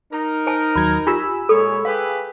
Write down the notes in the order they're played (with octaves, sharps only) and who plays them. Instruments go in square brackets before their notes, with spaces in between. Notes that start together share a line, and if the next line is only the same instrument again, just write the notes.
[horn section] D#4 A#4
[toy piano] C5 G#5 A5
[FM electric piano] D#2 F#3 G#6 [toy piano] B5
[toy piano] F4 G4 [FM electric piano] G#5 B5 E6
[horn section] A#2 G#3 C#5 [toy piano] A4
[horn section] G4 G#4 B4 [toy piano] F5